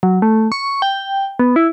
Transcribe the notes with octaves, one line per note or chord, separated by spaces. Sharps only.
F#3
A3
C#6
G5
B3
E4